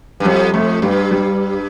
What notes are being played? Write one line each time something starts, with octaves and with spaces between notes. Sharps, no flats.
G2
F2 G3
F2 A3
G2 G3
G3